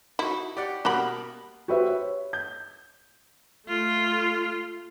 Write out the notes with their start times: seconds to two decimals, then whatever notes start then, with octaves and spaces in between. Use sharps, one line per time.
0.19 D#4 E4 F#4
0.57 G4 D5 F#5
0.85 B2 A#3 F#4 G4 B5
1.68 F#4 G4 B4 C5 E5
1.88 C#5
2.33 G6
3.67 A3 F4